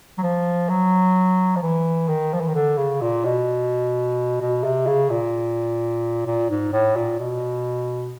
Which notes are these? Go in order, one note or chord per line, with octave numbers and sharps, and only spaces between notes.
F#3
F3
F#3
F3
E3
D#3
F3
E3
D#3
D3
C#3
A#2
B2
B2
C3
C#3
A#2
A#2
G#2
A2
A#2
B2